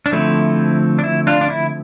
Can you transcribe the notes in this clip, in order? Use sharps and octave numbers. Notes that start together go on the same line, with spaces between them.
D4
D3 F3 A3 C4 E4
D4
E4
D4 F4
D4
E4